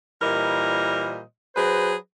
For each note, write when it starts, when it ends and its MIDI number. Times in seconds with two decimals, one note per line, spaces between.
0.22 1.20 46
0.22 1.20 52
0.22 1.20 55
0.22 1.20 70
0.22 1.20 72
0.22 1.20 75
1.55 1.95 54
1.55 1.95 68
1.55 1.95 71
1.55 1.95 72